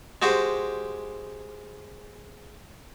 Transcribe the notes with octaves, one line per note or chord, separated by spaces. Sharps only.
G#3 F#4 G4 C5